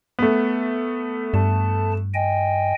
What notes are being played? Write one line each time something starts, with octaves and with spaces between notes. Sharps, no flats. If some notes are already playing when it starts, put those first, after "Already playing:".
A3 B3
G2 A5
D#5 G5 G#5